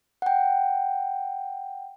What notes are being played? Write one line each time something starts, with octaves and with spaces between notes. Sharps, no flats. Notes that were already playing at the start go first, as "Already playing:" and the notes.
F#5 G5